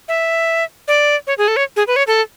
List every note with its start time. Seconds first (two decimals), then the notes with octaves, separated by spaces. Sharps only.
0.08 E5
0.88 D5
1.27 C#5
1.38 G#4
1.48 A4
1.57 C#5
1.76 G#4
1.88 B4
1.96 C#5
2.07 A4